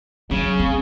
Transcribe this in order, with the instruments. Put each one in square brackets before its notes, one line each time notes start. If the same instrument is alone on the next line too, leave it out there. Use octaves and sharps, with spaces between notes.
[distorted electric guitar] C#3 [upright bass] F#3
[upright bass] C4